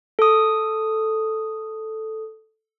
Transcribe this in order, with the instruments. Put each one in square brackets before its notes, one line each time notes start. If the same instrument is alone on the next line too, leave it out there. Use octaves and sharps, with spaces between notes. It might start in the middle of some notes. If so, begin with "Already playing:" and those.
[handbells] A4 D#6